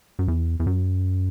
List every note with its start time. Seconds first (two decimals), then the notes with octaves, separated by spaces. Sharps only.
0.19 F#2
0.28 E2
0.60 E2
0.67 F#2